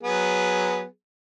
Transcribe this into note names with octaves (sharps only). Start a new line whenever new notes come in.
F#3 B3 G#4